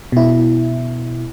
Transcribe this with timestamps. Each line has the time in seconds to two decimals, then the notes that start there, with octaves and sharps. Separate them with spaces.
0.12 B2 E4